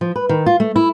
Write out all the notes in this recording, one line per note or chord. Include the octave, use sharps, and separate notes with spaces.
F3
B4
D#3
F4
A3
E4